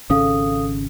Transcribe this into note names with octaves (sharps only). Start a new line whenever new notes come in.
G#1 C#3 C#4 A4 F5 D#6